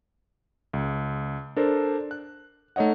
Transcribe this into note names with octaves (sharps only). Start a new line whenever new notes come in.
C#2
D4 A4 A#4 C5
F#6
A3 D#4 C#5 D#5 F#5